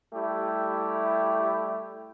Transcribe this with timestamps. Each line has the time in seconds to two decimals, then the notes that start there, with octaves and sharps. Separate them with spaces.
0.13 G3 A3 E4 G4